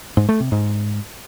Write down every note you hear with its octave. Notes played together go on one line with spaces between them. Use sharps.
G#2
A3
C3
G#2